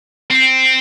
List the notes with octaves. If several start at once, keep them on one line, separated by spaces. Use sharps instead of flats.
C4